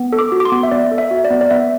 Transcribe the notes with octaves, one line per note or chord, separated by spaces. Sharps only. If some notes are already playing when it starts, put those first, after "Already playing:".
Already playing: B3
A4
D6
F#4
D6
C6
B3
E5
B3 D5
A4
E5
F#4
D5
B3
D5
B3 E5